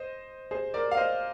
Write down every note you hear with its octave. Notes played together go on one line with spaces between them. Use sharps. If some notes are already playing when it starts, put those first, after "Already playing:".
Already playing: C5 D#5
G#4 C5
A#4 D5
F5
C5 D#5